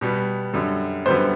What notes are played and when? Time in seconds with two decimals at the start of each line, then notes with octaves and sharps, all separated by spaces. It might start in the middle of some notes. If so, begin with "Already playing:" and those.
0.01 B2 G3 B3
0.53 F#2 D3 G3
1.06 F#2 D3 G3 B3 C5